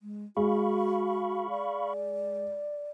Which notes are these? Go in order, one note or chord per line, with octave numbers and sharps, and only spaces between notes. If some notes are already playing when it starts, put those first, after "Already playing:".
G#3
G#3 F#4 F5 B5 C#6
D5